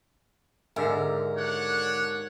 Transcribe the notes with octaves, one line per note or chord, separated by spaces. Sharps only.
D#2 G#2 D3 A#4 E5
D4 C#5 F#5